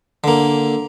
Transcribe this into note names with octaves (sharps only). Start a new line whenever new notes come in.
D3 A#3